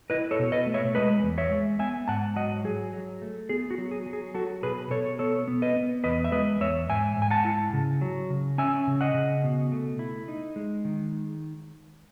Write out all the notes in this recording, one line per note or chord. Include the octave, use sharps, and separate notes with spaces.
E4 B4 D#5
A4 C#5
B2
B4 D#5
A3
C#5 E5
G#3 B4 D#5
E2
C#5 E5
G#3
B3 E5 G#5
G#2 F#5 A5
F#3 D#5 F#5
F#3 G#4
F#3
A3
B3 G#4
F#4
F#3
G#4
F#3
G#4
F#3 F#4 A4
B2 G#4 B4
B2 A4 C#5
B3 A4 C#5
B3
B4 D#5
B3
E2 B4 D#5
E5
G#3 B4 D#5
E2 C#5 E5
G#2 E5 G#5
G#2
G#5
F#5 A5
E4
C#3
F#3
C#3
C#4 E5 G#5
C#3
D#5 F#5
C#3
B2
A3
E4
D#4
G#3
D#3